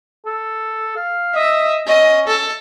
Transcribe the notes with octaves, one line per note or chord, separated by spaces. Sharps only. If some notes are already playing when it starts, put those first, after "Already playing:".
A4
F5
D#5 E5
C#4 D#5
A4